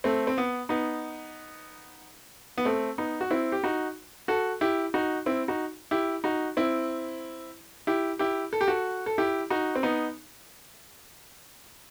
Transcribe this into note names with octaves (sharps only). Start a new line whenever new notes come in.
A3 C4
C4
B3
B3 D#4
B3
A3 C4
B3 D#4
F#4
C4 E4
G4
D#4 F#4
F#4 A4
E4 G4
D#4 F#4
C4 E4
D#4 F#4
E4 G4
D#4 F#4
C4 E4
E4 G4
E4 G4
A4
G4
F#4 A4
A4
E4 G4
D#4 F#4
C4
B3 D#4